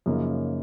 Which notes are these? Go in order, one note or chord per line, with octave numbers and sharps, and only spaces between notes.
F#2 C#3 F3 A#3 D#4